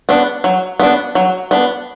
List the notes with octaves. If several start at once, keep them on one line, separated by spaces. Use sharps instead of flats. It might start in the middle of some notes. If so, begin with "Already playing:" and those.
B3 D4
F#3
B3 D4
F#3
B3 D4